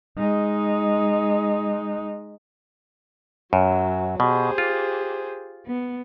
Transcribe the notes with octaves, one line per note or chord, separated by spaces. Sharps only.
G#3 D#4
F#2 F#3
B2 G4 G#4 C5
F4
B3